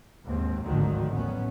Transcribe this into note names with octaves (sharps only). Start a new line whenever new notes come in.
D#2 G#2 C4
G#1 D2 D3 D#3 F3 F#3
A1 D#2 B3 C#4